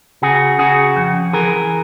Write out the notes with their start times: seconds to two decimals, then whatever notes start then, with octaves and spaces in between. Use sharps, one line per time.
0.22 C#3 F#4 G#4
0.59 C#3 F#4 G#4
0.97 F2
1.33 E3 G#4 A#4